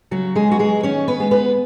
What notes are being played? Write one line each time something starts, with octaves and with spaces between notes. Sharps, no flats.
C#3 F#3 F#4
G#3 G#4
F#3 B3 F#4
G#3 G#4
D#3 C#4 C#5
B3 B4
G#3 B3
B3 B4